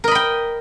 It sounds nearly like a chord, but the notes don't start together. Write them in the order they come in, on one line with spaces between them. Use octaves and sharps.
A#4 D#5 B5 G5